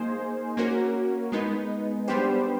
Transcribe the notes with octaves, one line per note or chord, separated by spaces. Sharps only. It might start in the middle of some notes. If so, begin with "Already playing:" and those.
Already playing: A#3 D#4 G#4 C5
A#3 C#4 F#4 A#4
G#3 B3 D#4
G3 B3 D4 G4 C5